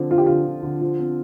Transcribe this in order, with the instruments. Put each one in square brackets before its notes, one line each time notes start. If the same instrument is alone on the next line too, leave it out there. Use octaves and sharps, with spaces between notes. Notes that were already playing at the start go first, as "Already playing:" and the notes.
Already playing: [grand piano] D3 F3 C4
[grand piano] F3 [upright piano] F4
[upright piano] G4
[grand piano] D3 [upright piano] F4
[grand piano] D3
D3
F3
C4